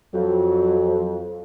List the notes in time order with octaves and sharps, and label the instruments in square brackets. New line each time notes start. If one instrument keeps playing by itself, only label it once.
[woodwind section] F2 [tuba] F#3